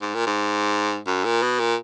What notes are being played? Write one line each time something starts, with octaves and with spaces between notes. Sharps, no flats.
G#2
A#2
G#2
F#2
A#2
B2
A#2